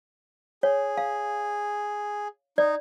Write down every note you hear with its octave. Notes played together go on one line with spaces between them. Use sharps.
G#4 C#5
F5
D#4 D5